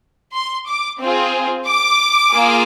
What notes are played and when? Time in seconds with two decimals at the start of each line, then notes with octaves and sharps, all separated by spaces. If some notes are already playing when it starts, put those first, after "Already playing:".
0.33 C6
0.67 D6
1.01 C4 F4 G#4
1.68 D6
2.35 A#3 F4 G#4